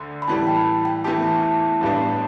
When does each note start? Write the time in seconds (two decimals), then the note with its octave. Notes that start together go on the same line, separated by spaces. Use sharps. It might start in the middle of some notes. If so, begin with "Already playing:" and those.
Already playing: D2 D3
0.22 B5
0.28 A2 E3 G3 A5
0.47 G5
0.85 G5
1.04 E2 E3 A3 G4 A5
1.43 A5
1.81 A1 G2 G3 B3 D4 A5